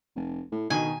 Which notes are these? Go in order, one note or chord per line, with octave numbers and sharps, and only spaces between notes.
F1
A2
D2 B2 D#3 G#5